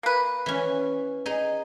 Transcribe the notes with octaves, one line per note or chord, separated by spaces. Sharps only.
A#3 B4
E3 C#4
D#4 G#4